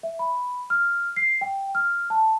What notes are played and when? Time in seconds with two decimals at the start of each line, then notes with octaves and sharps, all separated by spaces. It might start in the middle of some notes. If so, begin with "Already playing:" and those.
0.03 E5
0.19 B5
0.70 F6
1.16 C7
1.41 G5
1.75 F6
2.10 A5